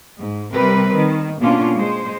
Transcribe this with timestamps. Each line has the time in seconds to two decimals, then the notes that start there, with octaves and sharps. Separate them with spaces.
0.19 G#2
0.52 C3 G3 C4 A#4 B4
0.94 D#3
1.40 B2 A#3 C#4 D4 F4
1.74 G#3 C5